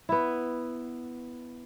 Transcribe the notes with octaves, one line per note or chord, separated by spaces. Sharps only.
B3 E4